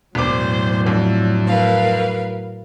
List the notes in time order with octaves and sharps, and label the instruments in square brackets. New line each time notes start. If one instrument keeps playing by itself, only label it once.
[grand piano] E1 D6 [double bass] A2 F#3 [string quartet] C5
[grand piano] F2 [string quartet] D4
[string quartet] A#4 B4 F5